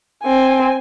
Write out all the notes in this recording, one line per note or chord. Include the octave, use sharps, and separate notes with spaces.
C4 G#5